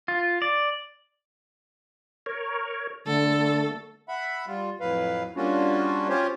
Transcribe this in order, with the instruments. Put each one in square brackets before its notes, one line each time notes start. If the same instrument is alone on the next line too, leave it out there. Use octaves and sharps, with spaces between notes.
[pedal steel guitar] F4
D5
[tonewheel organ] A#4 C#5
[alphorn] D3 [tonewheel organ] A3 [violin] A4
[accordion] E5 F#5 B5
G3 F4
F2 A2 F#3 B4 F5
G3 A#3 C#4 D4 F4 F#4
C#4 F4 G4 C5 C#5